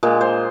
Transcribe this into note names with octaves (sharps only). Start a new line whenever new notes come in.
A#2 G#3
C5